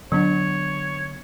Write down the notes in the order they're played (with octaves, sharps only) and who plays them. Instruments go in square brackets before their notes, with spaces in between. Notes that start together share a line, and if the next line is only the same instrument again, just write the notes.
[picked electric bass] D3 B3 [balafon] F#3 D4 [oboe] C#5